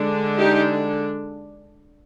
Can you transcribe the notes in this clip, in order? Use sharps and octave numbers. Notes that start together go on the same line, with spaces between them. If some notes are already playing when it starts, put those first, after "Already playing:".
Already playing: D3 G#3 D4
D#4 G4